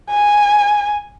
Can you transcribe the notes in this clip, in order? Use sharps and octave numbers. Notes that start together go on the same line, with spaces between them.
G#5